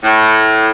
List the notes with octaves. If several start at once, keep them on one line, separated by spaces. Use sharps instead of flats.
A2